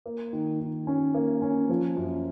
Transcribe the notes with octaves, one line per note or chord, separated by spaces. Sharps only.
A#3
D#3
D#3
C#4
A#3
C#4
F3
F#2